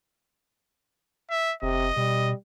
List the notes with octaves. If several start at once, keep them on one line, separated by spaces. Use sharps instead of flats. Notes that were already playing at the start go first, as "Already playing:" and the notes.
E5
F1 C3 D#5
B2 G3